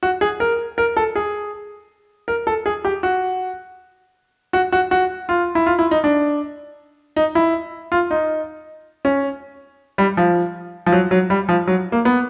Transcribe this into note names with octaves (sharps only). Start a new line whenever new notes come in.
F#4
G#4
A#4
A#4
A4
G#4
A#4
A4
G#4
G4
F#4
F#4
F#4
F#4
F4
E4
F4
E4
D#4
D4
D#4
E4
F4
D#4
C#4
G3
F3
F3
F#3
F#3
G3
F3
F#3
A#3
B3